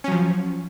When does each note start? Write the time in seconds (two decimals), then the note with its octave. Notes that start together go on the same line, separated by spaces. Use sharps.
0.04 C#4
0.08 F#3
0.12 F3